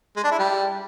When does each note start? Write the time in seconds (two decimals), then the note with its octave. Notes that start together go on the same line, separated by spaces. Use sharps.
0.16 G#3
0.24 D4
0.31 E4
0.39 G3